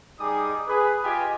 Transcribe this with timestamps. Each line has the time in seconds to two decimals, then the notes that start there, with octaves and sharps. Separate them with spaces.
0.20 G3 D#4 G#4 G#5 D6 D#6
0.67 G#4 B4
1.04 F4 G4 D#5 G5 G#5